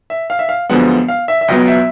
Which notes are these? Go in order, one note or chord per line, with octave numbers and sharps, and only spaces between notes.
E5
F5
E5
F5
F#2 D3 F3 G#3 B3 F#5
F5
E5
E5
C#2 B2 F#3 B3 D#5
E5